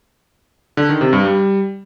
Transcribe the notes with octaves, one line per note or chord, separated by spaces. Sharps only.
D3
D#3
C3
G2
G3